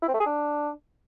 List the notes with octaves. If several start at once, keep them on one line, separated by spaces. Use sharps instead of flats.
E4
C4
A3
G#4
D4